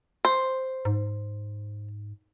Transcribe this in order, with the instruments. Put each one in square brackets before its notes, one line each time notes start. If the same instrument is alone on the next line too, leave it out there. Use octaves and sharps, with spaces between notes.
[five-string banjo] C5
[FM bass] G#2